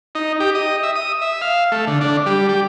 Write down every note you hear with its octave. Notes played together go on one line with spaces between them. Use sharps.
D#4
G4
D#5
E5
D#6
E5
F5
A3
D3
D4
G3
G4